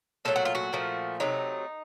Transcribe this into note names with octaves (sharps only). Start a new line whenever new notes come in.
A#2 F#3 A3 A4
F#4
F4
F#4
A#2 F3 A3
C3 F#3 A3 D#4